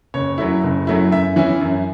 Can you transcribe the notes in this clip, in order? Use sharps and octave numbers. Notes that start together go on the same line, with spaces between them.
F#1 C#5
F#2 F#3 A3 E4
F#1
F#2 F#3 A3 E4
F#2 E5
E3 C#4 E4
F#2